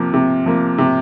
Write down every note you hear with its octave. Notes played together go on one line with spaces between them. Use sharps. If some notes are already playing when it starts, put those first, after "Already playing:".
Already playing: C3 F3 A#3
C3
F3 A#3
C3